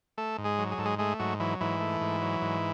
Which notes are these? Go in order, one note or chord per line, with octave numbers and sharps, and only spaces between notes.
A3 A4
G#2
G#3 G#4
F#3
G#4
G#2 A4
G#3 G#4
G#3 A3 G#4
G#2 F#3 F#4
E3 F#3 E4
G#2 E3 E4
A3
G#2
F#3
G#2